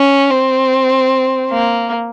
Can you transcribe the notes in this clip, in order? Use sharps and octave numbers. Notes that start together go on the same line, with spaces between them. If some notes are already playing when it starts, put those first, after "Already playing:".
Already playing: C#4
C4
A#3